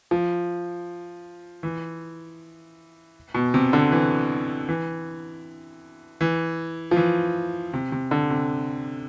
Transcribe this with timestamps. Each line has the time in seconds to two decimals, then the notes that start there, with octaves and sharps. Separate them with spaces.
0.11 F3
1.63 E3
3.34 B2
3.54 C3
3.73 D3
3.92 E3
4.69 E3
6.21 E3
6.91 F3
6.96 E3
7.73 C3
7.92 C3
8.11 D3
8.30 C3